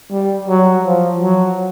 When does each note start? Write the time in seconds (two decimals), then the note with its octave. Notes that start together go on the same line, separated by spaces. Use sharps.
0.12 G3
0.48 F#3
0.85 F3
1.22 F#3